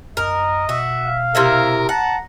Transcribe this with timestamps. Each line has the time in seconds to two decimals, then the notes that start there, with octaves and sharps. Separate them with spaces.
0.17 F#2 A#4 D#5
0.69 B2 F#4 E5
1.06 F5
1.35 C3 E4 A#4 E5
1.89 F#5 A5 A#5